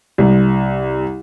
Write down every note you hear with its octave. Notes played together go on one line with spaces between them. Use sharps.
C2